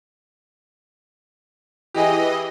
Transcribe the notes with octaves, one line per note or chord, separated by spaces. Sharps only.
E3 G4 G#4 D#5